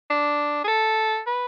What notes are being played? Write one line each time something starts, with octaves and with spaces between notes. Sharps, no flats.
D4
G#4
A4
B4